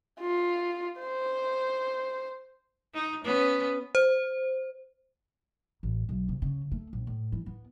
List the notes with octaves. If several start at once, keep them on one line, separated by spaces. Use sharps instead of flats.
F4
C5
D#4
B3 C#4
C5
A1
B1
C3
C#3
A3
A#1
A2
E3
B3